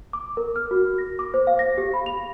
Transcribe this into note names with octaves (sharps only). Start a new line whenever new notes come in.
D6
A#4
F6
F#4
A#6
D6
C5
F5
A#6
G4
B5
F7